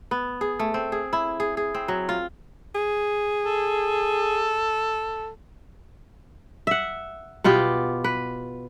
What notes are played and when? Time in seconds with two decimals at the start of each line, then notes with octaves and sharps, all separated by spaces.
0.11 B3
0.41 G#4
0.59 A3
0.74 C4
0.92 G#4
1.13 E4
1.40 G#4
1.57 G#4
1.74 C4
1.88 F#3
2.09 F4
2.75 G#4
3.45 A4
6.67 E5 F#5
7.44 B2 B3 F4 G4
8.04 B4